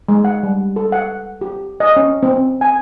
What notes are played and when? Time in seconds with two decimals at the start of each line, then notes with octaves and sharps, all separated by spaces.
0.09 G#3
0.25 F#5
0.43 G3
0.76 A4
0.92 F#5
1.41 G4
1.80 D#5
1.97 C#4
2.23 C4
2.61 G#5